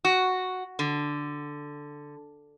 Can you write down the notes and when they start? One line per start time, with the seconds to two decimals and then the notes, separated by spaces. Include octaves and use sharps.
0.05 F#4
0.79 D3